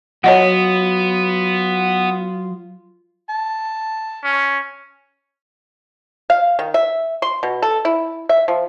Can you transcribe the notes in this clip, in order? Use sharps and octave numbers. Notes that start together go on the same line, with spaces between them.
F#3 B3 F4 C#5 D#5 F#5
A5
C#4
F5
D#3
E5
C6
B2
A4
E4
E5
F3